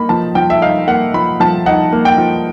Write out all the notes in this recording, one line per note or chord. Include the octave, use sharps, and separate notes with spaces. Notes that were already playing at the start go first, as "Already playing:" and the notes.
Already playing: A#3 D#4 B5
F3 A5
F3 G5
E5
D#4 F5
A#3 F#5
F3 B5
F3 A5
D#4 F#5
A#3
G5
F3